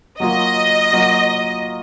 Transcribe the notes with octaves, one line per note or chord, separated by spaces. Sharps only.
F#3 A#3 F4 D#5
F#3 A#3 F4